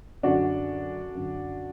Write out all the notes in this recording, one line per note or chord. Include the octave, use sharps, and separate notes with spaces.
F#2 D3 D4 F#4
F#2 D3